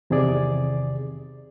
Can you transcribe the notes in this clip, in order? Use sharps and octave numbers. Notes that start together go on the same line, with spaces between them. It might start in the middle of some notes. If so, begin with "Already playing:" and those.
E2 C3 D#3 G#4 D5